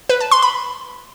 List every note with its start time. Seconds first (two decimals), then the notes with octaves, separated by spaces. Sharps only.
0.09 B4
0.20 A5
0.31 C6
0.42 B5